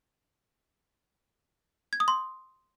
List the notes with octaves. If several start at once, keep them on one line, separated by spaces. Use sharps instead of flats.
G#6
D#6
C6